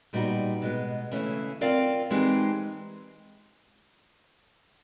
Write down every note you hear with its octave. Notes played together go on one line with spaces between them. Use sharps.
A#2 G3 B3 D#4 F#4
B2 G#3 B3
C#3 E3 A3 C#4
C4 F4 A#4 D5 F5
E3 G#3 C4 D#4 G4